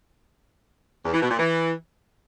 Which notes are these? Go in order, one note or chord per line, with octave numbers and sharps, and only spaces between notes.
E2
E3
B2
A#2
E3